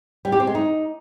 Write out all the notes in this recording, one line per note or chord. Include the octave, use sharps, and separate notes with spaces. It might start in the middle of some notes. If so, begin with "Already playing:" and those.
G3
G4
C4
G#3
D#4